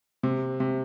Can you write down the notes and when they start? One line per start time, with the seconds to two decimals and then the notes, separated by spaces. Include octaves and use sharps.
0.23 C3
0.60 C3